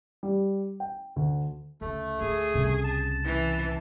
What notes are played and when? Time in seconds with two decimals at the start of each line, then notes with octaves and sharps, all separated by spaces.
0.23 G3
0.80 G5
1.16 D2
1.81 D2 C#3 A3
2.21 D2 G#4
2.54 C2 C#3
2.84 A5
3.25 E3